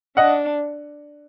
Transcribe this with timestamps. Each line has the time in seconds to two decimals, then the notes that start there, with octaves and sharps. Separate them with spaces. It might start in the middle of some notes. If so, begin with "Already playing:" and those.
0.17 D4 D#5 F#5